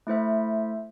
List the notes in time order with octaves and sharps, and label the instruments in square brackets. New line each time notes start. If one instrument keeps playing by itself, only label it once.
[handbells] A3 E4 C5 E5